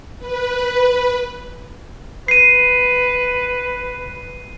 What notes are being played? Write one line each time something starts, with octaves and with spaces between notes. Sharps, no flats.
B4
B4 C7 D#7